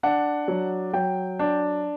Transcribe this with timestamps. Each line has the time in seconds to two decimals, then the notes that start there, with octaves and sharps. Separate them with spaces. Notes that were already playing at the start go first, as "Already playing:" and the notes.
0.03 D4 F#5
0.48 F#3
0.93 F#3 G5
1.39 D4